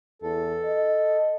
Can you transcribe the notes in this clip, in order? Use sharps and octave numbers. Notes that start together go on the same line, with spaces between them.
E2 A4
D#5